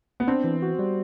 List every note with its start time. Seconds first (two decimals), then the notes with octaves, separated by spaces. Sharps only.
0.20 B3
0.27 C4 D4
0.44 E3
0.62 F#4
0.79 G3